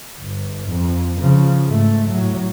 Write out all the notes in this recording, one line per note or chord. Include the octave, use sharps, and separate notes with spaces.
G1
F2
C#3 F3
G#2 A3
A2 F#3